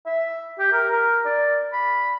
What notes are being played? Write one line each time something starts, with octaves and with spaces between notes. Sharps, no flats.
E5
G4
A#4
A#4
D5
B5